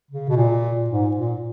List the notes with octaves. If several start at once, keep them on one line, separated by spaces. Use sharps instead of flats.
C#3
B2
A#2
G#2
A#2